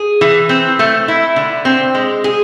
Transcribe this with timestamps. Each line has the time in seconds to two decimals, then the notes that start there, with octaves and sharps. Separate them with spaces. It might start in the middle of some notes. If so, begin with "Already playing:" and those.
Already playing: G#4
0.21 E3
0.49 C4
0.79 A3
1.08 E4
1.36 D3
1.65 C4
1.95 G#3
2.24 G#4